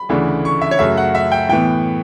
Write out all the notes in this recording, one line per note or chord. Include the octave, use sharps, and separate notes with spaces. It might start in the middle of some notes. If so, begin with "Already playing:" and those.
Already playing: B5
D2 C#3 E3 A3 D4
C#6
E5
C#5
F#2 C#3 F#3 A3 E5
F#5
E5
G5
A2 E3 B3 G5